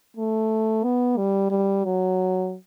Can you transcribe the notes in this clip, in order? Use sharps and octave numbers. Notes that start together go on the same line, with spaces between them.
A3
B3
G3
G3
F#3